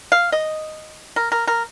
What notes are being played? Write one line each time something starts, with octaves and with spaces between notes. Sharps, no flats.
F5
D#5
A#4
A#4
A#4